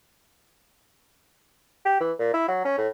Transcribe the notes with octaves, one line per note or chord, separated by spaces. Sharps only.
G4
E3
A#2
E4
F#3
C#4
A2